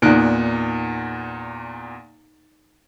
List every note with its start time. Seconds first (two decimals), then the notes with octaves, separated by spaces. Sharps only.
0.02 E2 A#2 D#4 F#6 D7